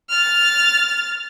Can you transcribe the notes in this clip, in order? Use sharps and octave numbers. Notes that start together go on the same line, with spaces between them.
F6 A6